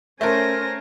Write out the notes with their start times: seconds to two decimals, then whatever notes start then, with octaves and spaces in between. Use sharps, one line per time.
0.21 A3 C#4 A#4 C5 G#5 A#6